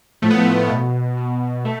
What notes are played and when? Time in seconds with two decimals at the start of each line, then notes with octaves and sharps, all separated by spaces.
0.22 A2 F3 A3
0.30 B3
0.38 A3
0.70 B2
1.17 B2
1.65 A3